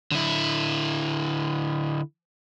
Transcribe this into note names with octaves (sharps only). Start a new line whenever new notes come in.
D3 E4